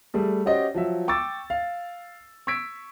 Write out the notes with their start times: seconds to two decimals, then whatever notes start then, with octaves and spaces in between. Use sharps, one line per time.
0.14 G3 A3 G#4
0.45 C#4 F#4 G4 C5 D5 D#5
0.74 F3 F#3 E5
1.08 G5 C#6 D6 E6 A6
1.50 F5
2.47 C#6 E6 G#6 B6 D7